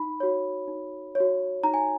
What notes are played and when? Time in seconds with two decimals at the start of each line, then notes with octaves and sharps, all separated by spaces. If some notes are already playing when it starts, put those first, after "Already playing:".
Already playing: D#4 B5
0.20 F#4 C#5
0.68 D#4
1.15 C#5
1.20 F#4
1.63 D#4 A#5
1.74 G#5